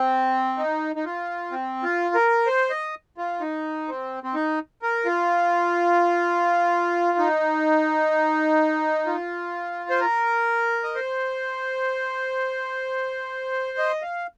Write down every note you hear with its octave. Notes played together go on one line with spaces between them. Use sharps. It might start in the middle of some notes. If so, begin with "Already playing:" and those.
Already playing: C4
D#4
D#4
F4
C4
F4
A#4
C5
D#5
F4
D#4
C4
C4
D#4
A#4
F4
D#4
F4
C5
A#4
D#5
C5
D#5
F5